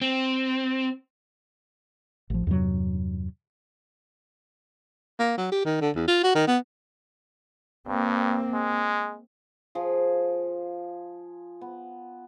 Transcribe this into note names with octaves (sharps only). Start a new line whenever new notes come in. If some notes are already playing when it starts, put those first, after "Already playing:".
C4
A1 F3
E2 G2 C3 F#3
A#3
F#3
G4
D#3
D3
E2
F4
F#4
D#3
B3
G2 A#3 C4
G#3
F3 G#4
B3